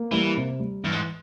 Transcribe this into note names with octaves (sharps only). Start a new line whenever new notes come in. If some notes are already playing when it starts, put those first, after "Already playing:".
Already playing: A#3
E3 G3
C3
G3
G2 E3
G#2